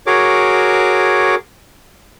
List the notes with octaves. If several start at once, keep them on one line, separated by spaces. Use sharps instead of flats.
F#4 G#4 A#4 C#5 D6